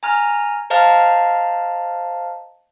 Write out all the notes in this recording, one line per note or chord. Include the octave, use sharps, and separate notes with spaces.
G#5 A#5 F6
C5 D#5 F5 A5 A#5 F6